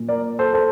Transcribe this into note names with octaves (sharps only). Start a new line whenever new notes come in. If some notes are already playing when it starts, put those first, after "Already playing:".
Already playing: A#2
A#4 D5
A4 C5
A4 C5